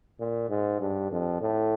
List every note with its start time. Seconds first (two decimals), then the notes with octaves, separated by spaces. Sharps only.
0.20 A#2
0.49 G#2
0.80 G2
1.11 F2
1.41 A2